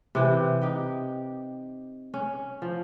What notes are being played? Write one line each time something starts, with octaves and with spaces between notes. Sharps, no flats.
C3 E3 G5
D#4 G4 G5
C#4
F3